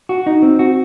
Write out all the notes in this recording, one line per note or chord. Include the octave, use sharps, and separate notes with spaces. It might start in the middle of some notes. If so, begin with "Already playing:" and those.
F#4
D#4
C4
F#4